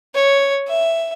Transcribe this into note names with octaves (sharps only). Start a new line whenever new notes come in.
C#5
E5